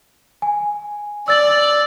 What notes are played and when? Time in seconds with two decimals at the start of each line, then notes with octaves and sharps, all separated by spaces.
0.42 G#5
1.28 D5 E6 A6 F#7